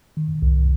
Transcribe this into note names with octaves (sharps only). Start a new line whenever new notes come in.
D#3
C2